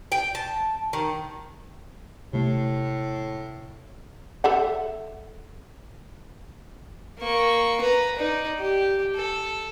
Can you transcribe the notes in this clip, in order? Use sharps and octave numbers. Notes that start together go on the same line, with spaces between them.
G5
A5
D#3
A2 C3 A3
A4 E5 F#5
A#3 C#6
B4 A#5
D#4 D5
G4
A4